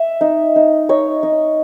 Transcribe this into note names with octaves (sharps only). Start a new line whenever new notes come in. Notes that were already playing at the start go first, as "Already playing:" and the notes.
Already playing: E5
D#4
D#4
D#4 C#5
D#4